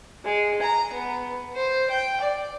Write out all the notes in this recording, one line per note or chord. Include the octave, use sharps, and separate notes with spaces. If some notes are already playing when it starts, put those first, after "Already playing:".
G#3
A#5
B3
C5
G5
D5